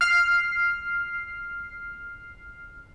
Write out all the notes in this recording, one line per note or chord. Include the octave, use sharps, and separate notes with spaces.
F6 C7